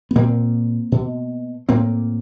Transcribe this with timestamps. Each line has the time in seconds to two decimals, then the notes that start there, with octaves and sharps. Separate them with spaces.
0.11 B3
0.15 A#2 A#3 C4
0.92 B2
1.69 A2 A#3 C4